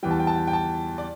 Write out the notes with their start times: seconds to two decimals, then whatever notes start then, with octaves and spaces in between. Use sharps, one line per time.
0.03 E2 E3 G3 G5
0.11 A5
0.20 G5
0.27 A5
0.36 G5
0.48 G5
0.53 A5
0.98 D5